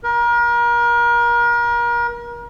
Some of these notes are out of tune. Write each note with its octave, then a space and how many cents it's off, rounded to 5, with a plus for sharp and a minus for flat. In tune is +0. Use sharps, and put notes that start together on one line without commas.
A#4 +35